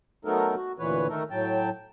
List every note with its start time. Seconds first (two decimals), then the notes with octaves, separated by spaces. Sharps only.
0.25 F#3 A3 B3 D#4 A4 A#4
0.55 F#4
0.79 D2 A#2 E3 B4 C#5
1.09 D#3 A3 D#4 A4 A#4
1.31 A2 F#3 G5 A5